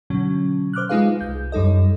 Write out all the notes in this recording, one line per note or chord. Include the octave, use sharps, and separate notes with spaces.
B2 D3 F#3 C#4
C5 D6 F6 F#6
G#3 D#4 F4 G#4 B4 F5
C2 G6
F#2 G3 D#4 A4 D#5